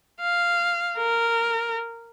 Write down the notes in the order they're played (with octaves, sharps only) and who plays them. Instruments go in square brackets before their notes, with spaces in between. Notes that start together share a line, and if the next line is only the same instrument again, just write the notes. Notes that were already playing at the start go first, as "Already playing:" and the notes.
[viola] F5
A#4